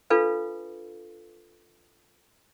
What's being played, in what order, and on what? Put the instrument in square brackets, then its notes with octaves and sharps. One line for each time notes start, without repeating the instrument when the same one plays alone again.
[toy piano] D4 F4 A4 B4 F5